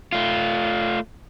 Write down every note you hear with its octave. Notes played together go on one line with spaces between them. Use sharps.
A3 F4